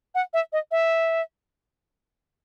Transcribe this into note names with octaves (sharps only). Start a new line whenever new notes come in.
F#5
E5
D#5
E5